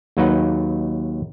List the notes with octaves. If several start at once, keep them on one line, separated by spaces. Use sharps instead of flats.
D#2 F#3 D#4 B4 F#5